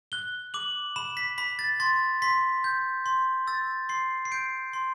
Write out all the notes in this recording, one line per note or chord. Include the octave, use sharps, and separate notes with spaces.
F#6 G7
D6 F#7
B5 E7
B6
B5 B6
A6
C6 A6
C6 B6
G6
C6
E6 A6
C6 C7
C7
G6 D7
C6